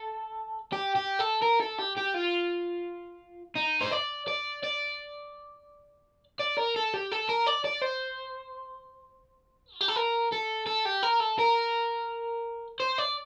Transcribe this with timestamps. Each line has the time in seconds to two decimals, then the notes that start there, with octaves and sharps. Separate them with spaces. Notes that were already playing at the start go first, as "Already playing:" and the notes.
Already playing: A4
0.73 G4
0.96 G4
1.20 A4
1.42 A#4
1.60 A4
1.78 G4
1.97 G4
2.14 F4
3.56 D#4
3.82 C5
3.92 D5
4.27 D5
4.63 D5
6.40 D5
6.58 A#4
6.76 A4
6.94 G4
7.12 A4
7.29 A#4
7.47 D5
7.65 D5
7.82 C5
9.74 F4
9.81 G4
9.88 A4
9.96 A#4
10.32 A4
10.66 A4
10.85 G4
11.03 A#4
11.20 A4
11.39 A#4
12.80 C5
12.98 D5